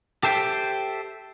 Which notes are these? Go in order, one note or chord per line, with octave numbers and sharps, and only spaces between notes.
G4 A4 C5 E5 G5